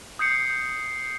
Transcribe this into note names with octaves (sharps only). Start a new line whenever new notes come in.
D#6 G6 C7 C#7